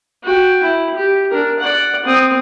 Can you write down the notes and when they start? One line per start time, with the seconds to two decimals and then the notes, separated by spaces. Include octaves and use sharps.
0.24 F#4 G5
0.64 E4
0.96 G4
1.31 D4 A#4
1.59 D5 F#5
2.06 C4 D#6